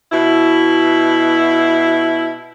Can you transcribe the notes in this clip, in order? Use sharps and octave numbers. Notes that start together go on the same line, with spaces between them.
B2 E4